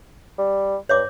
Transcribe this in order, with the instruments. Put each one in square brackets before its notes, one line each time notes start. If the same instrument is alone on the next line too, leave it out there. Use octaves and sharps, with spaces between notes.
[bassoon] G3
[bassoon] G2 [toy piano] C#5 E5 D6